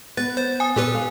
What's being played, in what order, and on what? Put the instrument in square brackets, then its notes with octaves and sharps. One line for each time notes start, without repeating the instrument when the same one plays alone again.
[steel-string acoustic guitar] B3 [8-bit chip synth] B4 [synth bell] A6
[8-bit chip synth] C5
[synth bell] G#5 D#6
[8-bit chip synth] A#2 G4 B4 [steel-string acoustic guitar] A4
[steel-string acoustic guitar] F5